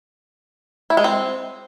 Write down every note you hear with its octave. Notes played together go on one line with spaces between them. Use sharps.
E4
G#3
C4